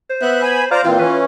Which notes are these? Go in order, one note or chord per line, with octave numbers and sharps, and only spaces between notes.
C5
B3 E5 F#6
G#5 B5
C5 D5 F5 A#5
A#2 E3 C4 F4
E3 C#4 B4